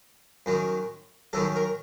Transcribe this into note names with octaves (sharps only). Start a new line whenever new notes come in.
F#2 D#3 F#3
F#2 D#3 F#3 A4
A#4